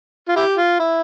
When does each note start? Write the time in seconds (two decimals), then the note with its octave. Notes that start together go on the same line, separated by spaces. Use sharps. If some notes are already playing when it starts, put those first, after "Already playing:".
0.28 F4
0.36 E4 G4
0.57 F4
0.79 E4